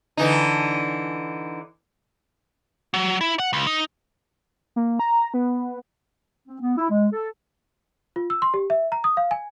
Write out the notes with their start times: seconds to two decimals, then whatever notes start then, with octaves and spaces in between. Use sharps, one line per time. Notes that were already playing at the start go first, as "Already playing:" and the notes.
0.17 D3 E3 D#4
2.94 F#3
3.21 E4
3.39 F#5
3.53 C#2
3.67 D#4
4.76 A#3
4.99 A#5
5.34 B3
6.48 C4
6.61 B3
6.77 E4
6.90 G#3
7.12 A4
8.16 F4
8.30 E6
8.42 C6
8.54 G4
8.70 E5
8.92 A#5
9.04 D#6
9.17 F5
9.31 G#5